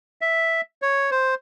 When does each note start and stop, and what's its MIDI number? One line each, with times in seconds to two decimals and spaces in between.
0.21 0.61 76
0.82 1.10 73
1.11 1.35 72